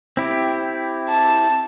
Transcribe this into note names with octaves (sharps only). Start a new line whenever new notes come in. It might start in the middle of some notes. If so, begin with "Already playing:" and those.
C4 E4 G4
A5